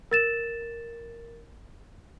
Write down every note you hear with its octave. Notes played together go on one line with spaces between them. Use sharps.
A#4 A6 E7